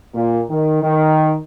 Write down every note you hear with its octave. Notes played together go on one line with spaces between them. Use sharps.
A#2
D#3
D#3